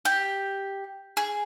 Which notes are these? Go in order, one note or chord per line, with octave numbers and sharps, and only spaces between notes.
G4
G#4